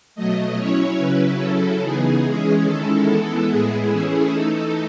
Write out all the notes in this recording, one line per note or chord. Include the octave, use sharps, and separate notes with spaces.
B2 F#3 A3 D#5
F#3 C#4 E4 C#5
C#3 F#3 C#4 E4 B4
C#3 F#3 C#4 E4 A4
C#3 E3 B3 D#4 G#4
E3 G#3 C#4
D#3 G#3 C#4 E4 A4
E3 G#3 B3 E4
A2 G#3 B3 E4 G#4
E3 A3 C#4 E4
E3 A3 D#4 A4